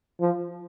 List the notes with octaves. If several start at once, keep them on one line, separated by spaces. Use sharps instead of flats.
F3